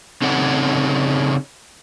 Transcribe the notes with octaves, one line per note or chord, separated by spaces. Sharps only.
C#3 C4 D#4 A4 C#5 F#5